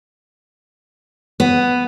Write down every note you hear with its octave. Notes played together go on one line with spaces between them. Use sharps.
B3